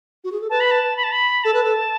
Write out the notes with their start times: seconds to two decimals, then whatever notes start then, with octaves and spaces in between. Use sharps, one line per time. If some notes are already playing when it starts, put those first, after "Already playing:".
0.24 F#4
0.32 G#4
0.41 A4
0.50 B4 A5
0.60 B5
0.71 A5
0.97 B5
1.04 A5
1.12 B5
1.44 A4 A5
1.54 B4
1.64 A4